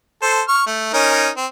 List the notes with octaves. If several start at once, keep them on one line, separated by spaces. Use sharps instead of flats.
A4 C5
C#6 F6
A3
C#4 D#4 A#4
C4